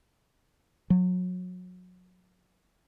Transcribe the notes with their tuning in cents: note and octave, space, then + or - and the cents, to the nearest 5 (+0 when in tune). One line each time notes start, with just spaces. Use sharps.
F#3 -30